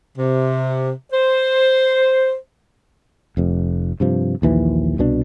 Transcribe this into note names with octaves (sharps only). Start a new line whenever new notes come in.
C3
C5
F1 F2
G2 C3 F3
A#1 D#2 E3 F3
C2 B2 C#4 D4